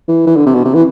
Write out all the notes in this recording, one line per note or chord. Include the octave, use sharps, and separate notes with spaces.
E3
E3
D3
C3
B2
C3
E3